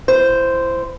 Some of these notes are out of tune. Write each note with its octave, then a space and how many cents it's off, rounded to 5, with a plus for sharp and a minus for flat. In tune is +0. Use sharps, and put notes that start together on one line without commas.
E4 +25 C5 -5